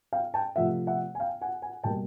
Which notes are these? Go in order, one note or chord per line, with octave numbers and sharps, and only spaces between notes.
F5 G5
G5 A5
C3 F3 A3 E5 F#5
E5 F#5
G#5
F5 G5
F#5 G#5
F#5 G#5
B2 G3 A#3 G5 A5